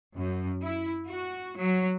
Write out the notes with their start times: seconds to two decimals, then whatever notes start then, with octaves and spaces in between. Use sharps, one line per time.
0.14 F#2
0.62 E4
1.07 F#4
1.57 F#3